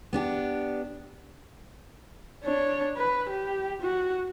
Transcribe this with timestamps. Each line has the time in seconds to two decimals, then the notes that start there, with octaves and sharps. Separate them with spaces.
0.13 B3 D4 G4
2.44 D4 C#5
2.97 B4
3.30 G4
3.82 F#4